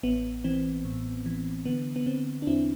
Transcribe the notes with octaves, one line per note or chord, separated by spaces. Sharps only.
A1 B3
E3 C4
A2
E3
D3 B3
B3
D3 C4
D4
E2 C4 E4